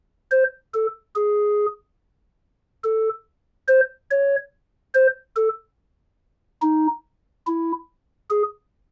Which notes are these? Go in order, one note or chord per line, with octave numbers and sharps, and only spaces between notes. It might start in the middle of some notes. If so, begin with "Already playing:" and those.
C5
A4
G#4
A4
C5
C#5
C5
A4
D#4
E4
G#4